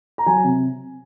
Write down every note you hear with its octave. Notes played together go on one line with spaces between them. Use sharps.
A#5
F#3 G#5
C3